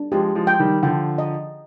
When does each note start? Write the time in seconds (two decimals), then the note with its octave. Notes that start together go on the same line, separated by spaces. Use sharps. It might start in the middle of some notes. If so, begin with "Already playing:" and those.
Already playing: D4
0.12 F3 G#3 G4
0.35 F3 G#3
0.47 G5
0.59 D#3 G3
0.83 D3 F3 G5
1.18 D#5